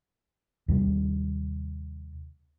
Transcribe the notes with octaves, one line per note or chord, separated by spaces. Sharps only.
D#2 C3 G3